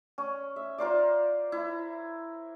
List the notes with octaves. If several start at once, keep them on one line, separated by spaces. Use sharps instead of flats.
C#4
E5
F4 A#4 C5 D5
E4